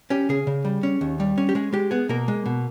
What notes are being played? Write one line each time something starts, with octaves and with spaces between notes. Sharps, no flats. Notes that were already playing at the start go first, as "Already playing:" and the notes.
C#4 G4
C#3 G#4
C#3
G3
C#4
D#2
G3
C#4
G4
G#3 G#4
G#3 G4
B3 G#4
B2 A#3 A#4
G#3
B2